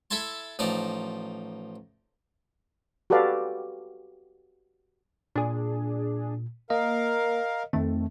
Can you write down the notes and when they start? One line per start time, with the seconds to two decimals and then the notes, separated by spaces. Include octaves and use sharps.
0.11 E4 A4 E5 G#5 A5 C6
0.59 A1 F3 D#4 D5
3.10 F#4 G4 A4 B4 D5 F5
5.36 A#2 D4 G#4
6.70 A#3 A#4 D#5 F5
7.73 F2 D#3 A3 C4